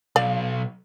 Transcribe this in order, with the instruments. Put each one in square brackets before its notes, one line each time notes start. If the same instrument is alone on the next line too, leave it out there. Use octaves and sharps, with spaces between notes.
[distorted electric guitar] B1 [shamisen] D5 F5